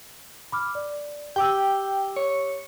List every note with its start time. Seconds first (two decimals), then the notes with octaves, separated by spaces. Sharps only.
0.52 B5 D6 F6
0.75 D5
1.36 G4 G5 D6 E6
2.16 C#5